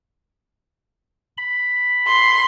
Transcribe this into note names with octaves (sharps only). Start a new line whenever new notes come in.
B5
C6